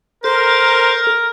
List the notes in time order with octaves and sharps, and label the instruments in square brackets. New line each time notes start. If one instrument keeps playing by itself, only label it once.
[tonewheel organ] A4 [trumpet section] A#4 [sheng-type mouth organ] C5